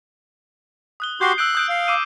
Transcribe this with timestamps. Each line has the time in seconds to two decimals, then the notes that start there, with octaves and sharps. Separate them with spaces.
1.00 D#6 F#6 G7
1.21 F#4 G4 C6 G6 C7 G7
1.38 E6 F#6 G6 D7
1.55 D#6 G6 D7
1.69 F5
1.88 D6 E6 D#7